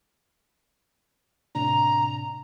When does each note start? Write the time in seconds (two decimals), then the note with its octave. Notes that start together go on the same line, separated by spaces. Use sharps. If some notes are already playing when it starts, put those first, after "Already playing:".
1.55 A2 C3 D4 A#5